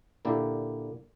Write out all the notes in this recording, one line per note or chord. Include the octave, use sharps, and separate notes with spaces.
A#2 D3 A#3 E4 G4